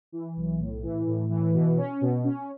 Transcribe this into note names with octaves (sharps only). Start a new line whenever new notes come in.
E3
B1
A2
E3
A2
E3
B2
C#4
B2
C#4